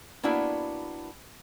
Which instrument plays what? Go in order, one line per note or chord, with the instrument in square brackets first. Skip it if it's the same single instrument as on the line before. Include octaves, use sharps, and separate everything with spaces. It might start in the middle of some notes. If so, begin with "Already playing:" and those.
[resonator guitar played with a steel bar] A#3 B3 D4 E4 F#4